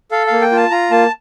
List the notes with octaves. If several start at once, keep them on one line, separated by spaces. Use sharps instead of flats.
A4 F5
A#3 F5
G5
F4 A5
F4 A#5
A#3 A5